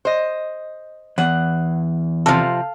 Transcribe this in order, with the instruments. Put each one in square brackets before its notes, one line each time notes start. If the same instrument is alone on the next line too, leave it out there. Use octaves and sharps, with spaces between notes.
[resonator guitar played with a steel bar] C5 D#5
[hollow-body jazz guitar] E2 [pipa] F#5
[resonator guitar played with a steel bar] C3 F3 [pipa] A4 F5